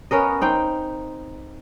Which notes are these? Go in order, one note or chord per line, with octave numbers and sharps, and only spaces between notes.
B3 C#4 A#4 D#5
C4 D#4 G5